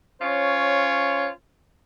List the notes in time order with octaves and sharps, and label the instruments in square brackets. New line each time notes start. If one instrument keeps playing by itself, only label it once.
[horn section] C#4 F4 C5 C#5